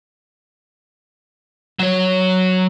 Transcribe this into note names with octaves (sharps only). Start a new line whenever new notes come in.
F#3 C#5